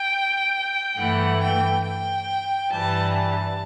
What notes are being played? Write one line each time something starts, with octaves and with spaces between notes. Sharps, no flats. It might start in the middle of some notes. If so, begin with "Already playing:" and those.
Already playing: G5
G2 E3 A3 F#5
G5
G5
G2 E3 G3 A5
A5